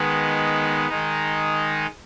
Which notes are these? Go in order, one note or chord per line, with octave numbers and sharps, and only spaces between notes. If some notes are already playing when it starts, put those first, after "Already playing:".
Already playing: D#3 G#3 B3
D#3 G#3 D#4